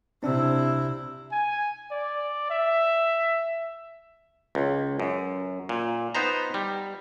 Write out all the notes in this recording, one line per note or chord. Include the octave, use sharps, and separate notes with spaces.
C3 C4 D4 E4
G#5
D5
E5
C#2
F#2
A#2
B3 D#4 C5 A#5
G3